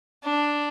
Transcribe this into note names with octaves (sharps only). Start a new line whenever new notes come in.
D4